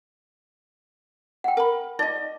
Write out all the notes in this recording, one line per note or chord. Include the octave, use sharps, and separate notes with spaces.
F#5 G5
A#4 B5
D#4 D5 D#5